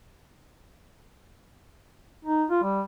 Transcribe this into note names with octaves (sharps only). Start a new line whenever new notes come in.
D#4
F4
G3